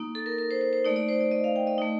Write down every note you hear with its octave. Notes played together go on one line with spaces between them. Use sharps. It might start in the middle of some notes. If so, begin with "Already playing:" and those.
Already playing: A#3 D#4
A4
A#4
A#4
C5
C5
C5
A3 D#4 D5
D5
C5
D5
D#5
F5
G5
D#5
A3 D#4